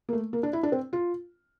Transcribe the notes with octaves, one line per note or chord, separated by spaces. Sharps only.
A#3
A3
A#3
D4
E4
D4
C4
F4